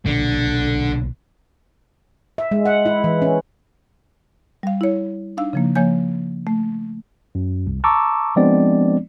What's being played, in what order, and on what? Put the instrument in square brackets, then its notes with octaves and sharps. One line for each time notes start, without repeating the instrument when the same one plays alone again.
[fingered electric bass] B1 A#2 [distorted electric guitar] D3
[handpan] E5
G#3
F#5
E4
E3
C#4
[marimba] G3 F5
E4 C#5
D4 D#4 F5 E6
C#3 F3 A#3
F3 A#3 C#5 G#5 G6
A3
[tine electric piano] F#2
C2
A5 A#5 C#6 D6 E6
F3 G#3 B3 C4 D4 D5